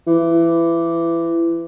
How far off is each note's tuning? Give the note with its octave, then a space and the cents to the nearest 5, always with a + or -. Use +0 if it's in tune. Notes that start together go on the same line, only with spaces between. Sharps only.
E3 +25